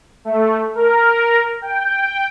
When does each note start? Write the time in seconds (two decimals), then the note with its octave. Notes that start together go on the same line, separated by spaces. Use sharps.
0.25 A3
0.75 A#4
1.62 G5